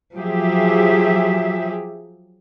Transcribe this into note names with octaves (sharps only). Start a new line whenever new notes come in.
F3 F#3 G4 G#4 E5